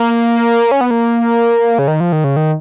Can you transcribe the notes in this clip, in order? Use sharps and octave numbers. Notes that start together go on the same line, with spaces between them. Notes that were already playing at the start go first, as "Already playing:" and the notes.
Already playing: A#3
C#4
B3
A#3
C#3
D#3
F3
D#3
C#3
D#3